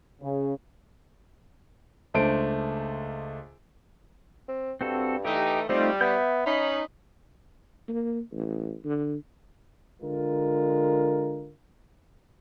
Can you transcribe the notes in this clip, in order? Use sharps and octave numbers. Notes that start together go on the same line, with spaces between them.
C#3
C#2 A3 D4 C5 D7
C4
G2 C4 F#4 A4
E3 A3 D#4 G4
G3 A3 C4 D#4 F4
B3 E5 G6
C#4 D#4 B5
A#3
A1
D3
D3 G#3 F4 A#4